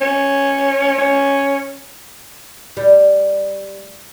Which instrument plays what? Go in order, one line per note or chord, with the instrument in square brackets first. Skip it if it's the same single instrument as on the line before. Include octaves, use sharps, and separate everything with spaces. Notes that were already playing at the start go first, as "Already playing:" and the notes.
[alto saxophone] C#4
C#4
[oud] G3